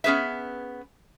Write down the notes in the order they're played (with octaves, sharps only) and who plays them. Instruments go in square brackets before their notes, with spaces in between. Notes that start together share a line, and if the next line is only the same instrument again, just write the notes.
[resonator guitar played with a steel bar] B3 C#4 G#4 B4 E5